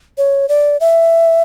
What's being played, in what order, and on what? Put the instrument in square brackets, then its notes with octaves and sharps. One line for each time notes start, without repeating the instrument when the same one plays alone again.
[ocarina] C#5
D5
E5